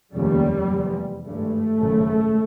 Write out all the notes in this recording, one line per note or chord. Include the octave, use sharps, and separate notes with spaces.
F1 D#2 C#3 G3
F1 E2 C3
G#1 G2 A3
G#1 F#2 C#3